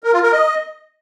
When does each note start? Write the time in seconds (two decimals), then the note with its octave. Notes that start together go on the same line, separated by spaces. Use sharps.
0.03 A#4
0.13 F4
0.23 A#4
0.32 D#5